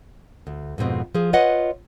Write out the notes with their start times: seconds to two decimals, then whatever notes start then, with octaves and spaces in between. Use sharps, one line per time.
0.47 D2
0.78 F2 G#2 B2 C4
1.15 F3 G#4
1.33 F4 B4 C#5 D#5 F#5